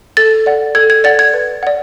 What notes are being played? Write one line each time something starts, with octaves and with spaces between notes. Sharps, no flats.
A4 A6
D5 F#5
A4 G#6
G#6
D5 F#5 A6
G#6
B4
D5 F#5